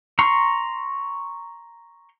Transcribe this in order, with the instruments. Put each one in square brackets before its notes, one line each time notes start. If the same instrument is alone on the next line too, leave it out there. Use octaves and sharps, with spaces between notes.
[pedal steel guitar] A#5 C6 C#6